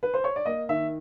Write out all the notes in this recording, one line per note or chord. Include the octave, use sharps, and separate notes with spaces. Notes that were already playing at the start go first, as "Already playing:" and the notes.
B4
C5
C#5
D5
A#3 D#5
D#3 E5